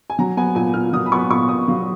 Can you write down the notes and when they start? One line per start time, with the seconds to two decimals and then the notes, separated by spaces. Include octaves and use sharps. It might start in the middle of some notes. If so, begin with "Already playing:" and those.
0.10 G#5
0.19 F#3 A#5
0.37 B3 G#5
0.55 A#2 G#5
0.74 A#2 F6
0.93 F#3 D#6
1.06 B5
1.12 B3 C#6
1.30 A#2 C#6
1.49 A#2 D#6
1.68 F#3 F5